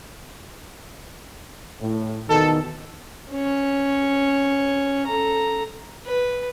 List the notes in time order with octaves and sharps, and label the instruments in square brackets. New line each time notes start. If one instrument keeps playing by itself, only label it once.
[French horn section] A2
[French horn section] E2 B2 D#3 [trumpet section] A4
[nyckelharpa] C#4 C#5
A4 A#5
[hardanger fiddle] B4